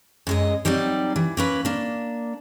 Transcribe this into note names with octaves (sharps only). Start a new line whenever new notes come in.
F#2 G#3 D#5
F#3 G3 C4 D#4 D5
E3
A#3 C#4 B4
A#3 D4